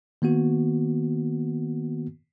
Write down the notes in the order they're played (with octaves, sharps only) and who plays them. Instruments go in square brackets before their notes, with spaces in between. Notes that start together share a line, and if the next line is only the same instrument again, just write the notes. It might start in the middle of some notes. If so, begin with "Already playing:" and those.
[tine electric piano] D#3 A#3 B3 F#4